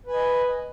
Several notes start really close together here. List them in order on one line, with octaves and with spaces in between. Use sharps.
B4 G#5 D#5